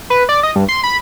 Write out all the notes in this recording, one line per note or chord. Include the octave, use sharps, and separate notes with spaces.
B4
D5
D#5
G2
C6
B5